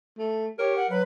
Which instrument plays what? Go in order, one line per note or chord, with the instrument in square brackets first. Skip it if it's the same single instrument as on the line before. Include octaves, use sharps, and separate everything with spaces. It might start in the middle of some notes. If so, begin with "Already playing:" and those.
[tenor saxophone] A3
[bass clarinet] G4 [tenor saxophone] A#4 [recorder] C#5
[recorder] F#5
[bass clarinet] F#3 [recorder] B4